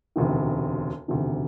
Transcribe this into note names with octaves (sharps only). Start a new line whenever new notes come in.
E1 D2 C3 D#3
E1 D2 C3 D#3